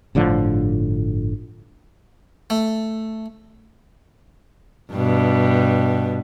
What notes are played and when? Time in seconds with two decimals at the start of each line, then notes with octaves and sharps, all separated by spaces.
0.15 G1 A2 D3 F3
2.50 A3
4.92 G2 B2